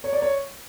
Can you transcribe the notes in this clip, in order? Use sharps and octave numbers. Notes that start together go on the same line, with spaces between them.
C#5
D5
C#5